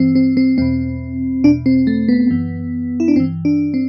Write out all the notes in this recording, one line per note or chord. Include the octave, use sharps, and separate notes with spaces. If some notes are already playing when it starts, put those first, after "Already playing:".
Already playing: G2 E3 C4
C4
C4
E2 B2 C4
E2 B2 D4
C4
A3
B3
F#2 E3
E4
D4
G2 E3 C4
D4
C4